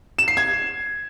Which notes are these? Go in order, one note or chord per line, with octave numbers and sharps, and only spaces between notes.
E7
C7
G#6